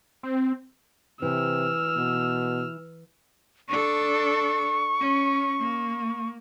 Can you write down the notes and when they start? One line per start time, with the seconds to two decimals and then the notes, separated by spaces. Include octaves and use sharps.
0.23 C4
1.22 C3 E3 E6 F6
1.96 B2
3.69 D4 A4 C#6
5.01 C#4
5.59 A#3